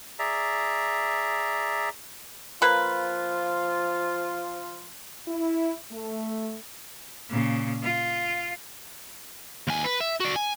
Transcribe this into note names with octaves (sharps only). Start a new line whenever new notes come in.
G#4 D5 E5 A#5
F3 A#3 F4 B4
E4
A3
A#2 C#3
F4
D#2 G#5
B4
E5
F#4 D5
G#5